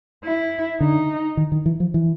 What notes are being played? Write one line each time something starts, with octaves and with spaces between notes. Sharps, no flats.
E4
D3 D#4
D#3
D#3
E3
F3
E3